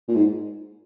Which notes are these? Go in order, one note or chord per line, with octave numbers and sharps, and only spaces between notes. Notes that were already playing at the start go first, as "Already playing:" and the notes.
A#2
G#2